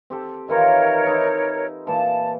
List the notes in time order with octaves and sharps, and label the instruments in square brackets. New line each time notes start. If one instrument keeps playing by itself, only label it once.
[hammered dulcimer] C4 G4 A4
[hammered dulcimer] D#3 E3 F4 [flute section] A#4 C#5
[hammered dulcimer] D#4 E4
[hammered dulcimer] A#2 E3 [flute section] A5